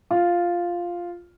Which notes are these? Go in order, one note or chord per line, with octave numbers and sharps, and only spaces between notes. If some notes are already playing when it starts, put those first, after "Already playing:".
F4